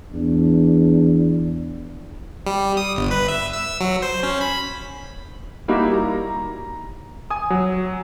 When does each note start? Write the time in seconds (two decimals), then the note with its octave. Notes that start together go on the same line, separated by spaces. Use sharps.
0.12 E2 D4
2.47 G3
2.77 D#6
2.96 G1
3.11 B4
3.28 E5
3.53 E6
3.81 F#3
4.02 C5
4.23 C#4
4.41 B5
5.68 G3 A#3 D#4 E4 F#4 G4
5.94 A#5
7.30 G#5 D#6
7.50 F#3